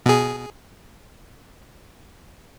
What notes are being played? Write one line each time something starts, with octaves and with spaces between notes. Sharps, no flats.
B2 G#4